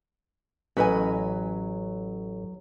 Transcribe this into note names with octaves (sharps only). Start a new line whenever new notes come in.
A1 F#3 C#4 B4 D#5 G#5